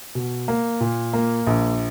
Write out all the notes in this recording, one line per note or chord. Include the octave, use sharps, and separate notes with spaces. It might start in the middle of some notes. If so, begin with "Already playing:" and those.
B2
A#3
A#2
A#3
A#1